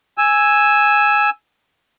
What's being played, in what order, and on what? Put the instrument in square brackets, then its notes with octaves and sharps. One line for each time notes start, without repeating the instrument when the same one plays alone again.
[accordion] G#5 E6